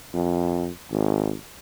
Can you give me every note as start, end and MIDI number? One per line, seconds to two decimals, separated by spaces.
0.14 0.70 41
0.92 1.35 32